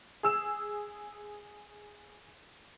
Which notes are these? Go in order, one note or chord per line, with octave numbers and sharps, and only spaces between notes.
G#4 E6 E7